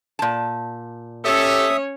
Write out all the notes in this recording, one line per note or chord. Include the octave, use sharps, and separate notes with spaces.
A#2 A5
C#4 G4 A4 C#5 E5 D#6